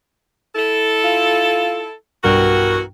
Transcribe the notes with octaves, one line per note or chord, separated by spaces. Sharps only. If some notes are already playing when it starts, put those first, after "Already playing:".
E4 A4
F4
B1 G2 B2 E3 F#4 A#4 G5